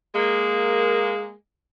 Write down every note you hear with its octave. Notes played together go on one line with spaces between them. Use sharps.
G#3 A#3